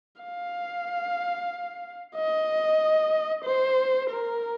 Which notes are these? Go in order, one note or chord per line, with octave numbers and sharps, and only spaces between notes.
F5
D#5
C5
A#4